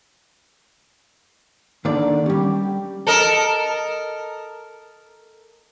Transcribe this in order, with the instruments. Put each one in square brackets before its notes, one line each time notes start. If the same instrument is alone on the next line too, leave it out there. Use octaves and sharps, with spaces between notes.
[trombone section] D3 [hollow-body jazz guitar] D#3 A#3 D5
[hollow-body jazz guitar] G3 C#4 [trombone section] G4
[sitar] A4 A#4 D#5